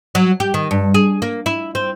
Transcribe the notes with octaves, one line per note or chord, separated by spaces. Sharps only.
F#3
G4
D#3
G2
G#4
A#3
E4
C4